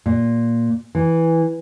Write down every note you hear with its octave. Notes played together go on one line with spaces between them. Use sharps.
A#2
E3